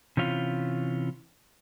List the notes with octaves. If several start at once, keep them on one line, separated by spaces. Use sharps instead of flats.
C3 E3 C#4 F4